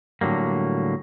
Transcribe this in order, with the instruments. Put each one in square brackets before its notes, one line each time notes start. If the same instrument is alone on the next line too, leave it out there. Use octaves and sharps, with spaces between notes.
[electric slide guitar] A2 D3 F#3 G3 A#3